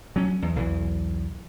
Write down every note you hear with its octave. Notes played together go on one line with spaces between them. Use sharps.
F#3 C#4
E2
B1 E2 E3